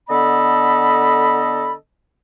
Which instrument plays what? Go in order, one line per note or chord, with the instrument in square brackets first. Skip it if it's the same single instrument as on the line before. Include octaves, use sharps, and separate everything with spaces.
[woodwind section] D3 B3 A4 D#5 B5